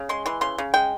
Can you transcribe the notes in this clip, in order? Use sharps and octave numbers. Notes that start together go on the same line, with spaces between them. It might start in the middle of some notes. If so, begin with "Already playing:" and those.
Already playing: C#3
G#3 C6
E3 C6
C#3 C6
C#3
G#3 G5